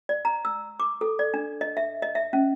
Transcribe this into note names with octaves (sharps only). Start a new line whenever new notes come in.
D5
A#5
E6
D6
A4
D5
D4
D#5
E5
D#5
E5
C#4